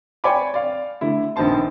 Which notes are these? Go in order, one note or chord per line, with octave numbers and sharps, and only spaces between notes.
C#5 D5 G5 G#5 B5 D6
D5 F5
D3 A3 E4
A#1 D#3 B3 C5 A5 C6